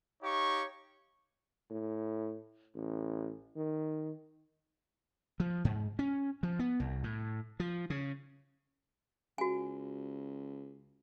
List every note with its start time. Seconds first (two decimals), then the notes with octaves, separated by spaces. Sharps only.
0.22 D#4 G4 C#5 F5 C#6
1.71 A2
2.75 A1
3.56 D#3
5.40 F3
5.65 G#2
5.99 C#4
6.43 F3
6.59 B3
6.80 C2
7.04 A2
7.60 F3
7.90 C#3
9.38 C#2 F#4 G#5